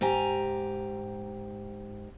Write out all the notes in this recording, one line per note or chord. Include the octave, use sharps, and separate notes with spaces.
G#2 G4 G#5 A#5